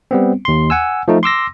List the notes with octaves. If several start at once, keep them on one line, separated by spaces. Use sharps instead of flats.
G3 B3 C4
D#2 C6
F#5 G#5 E6
F3 A3 D#4
C6 D6 E6 A#6